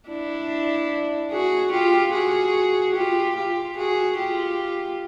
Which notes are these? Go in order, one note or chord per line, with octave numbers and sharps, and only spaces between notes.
D4 E4
F#4 G#4
F4 G4
F#4 G#4
F4 G4
F4 G4
F#4 G#4
F4 G4